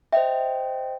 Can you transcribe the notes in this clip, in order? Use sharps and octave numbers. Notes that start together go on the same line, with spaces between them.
C5 D#5 E5 G5